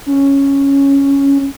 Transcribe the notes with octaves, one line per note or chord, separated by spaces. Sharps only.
C#4